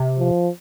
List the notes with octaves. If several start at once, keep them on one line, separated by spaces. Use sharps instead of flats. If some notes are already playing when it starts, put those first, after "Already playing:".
Already playing: C3
F3